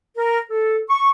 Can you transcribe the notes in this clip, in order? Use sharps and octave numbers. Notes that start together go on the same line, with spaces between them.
A#4
A4
C#6